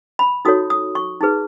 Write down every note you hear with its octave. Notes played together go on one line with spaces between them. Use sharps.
B5
D#4 F#4 A4 C#5 D#6
D#6
C#6
D#4 G#4 B4